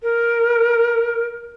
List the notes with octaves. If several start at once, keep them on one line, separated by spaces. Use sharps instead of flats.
A#4